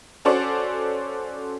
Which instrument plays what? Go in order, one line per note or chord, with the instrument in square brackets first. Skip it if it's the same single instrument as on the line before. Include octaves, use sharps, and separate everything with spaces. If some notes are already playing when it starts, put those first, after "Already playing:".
[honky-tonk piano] C#4 F#4 A4 C5 D5